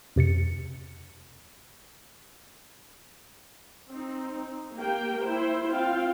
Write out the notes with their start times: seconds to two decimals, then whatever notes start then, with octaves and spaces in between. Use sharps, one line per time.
0.16 F2 C3 A6 C#7
3.90 C4 D#4
4.76 A#3 G4 G5
5.22 E4 C5
5.70 C4 F4 F5 G5